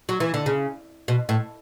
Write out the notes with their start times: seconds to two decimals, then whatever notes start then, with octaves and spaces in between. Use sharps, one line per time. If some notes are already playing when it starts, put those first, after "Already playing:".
0.09 F#3
0.20 E3
0.34 D3
0.46 C#3
1.08 B2
1.29 A2